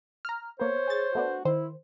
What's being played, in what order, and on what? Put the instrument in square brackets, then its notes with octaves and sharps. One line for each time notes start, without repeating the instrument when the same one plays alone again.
[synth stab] A#5 F6
[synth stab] A#3 B3 [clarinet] C5 [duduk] C#5
[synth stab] G#4 A6
[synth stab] A3 B3 D4 [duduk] F#4
[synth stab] D#3 C5 [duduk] E4